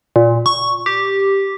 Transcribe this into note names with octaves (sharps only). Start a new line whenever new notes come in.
A#2
C#6
G4